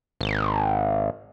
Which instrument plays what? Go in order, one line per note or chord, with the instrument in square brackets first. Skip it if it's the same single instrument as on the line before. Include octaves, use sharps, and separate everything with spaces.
[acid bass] G#1